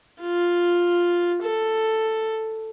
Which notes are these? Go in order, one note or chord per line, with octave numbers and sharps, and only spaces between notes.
F4
A4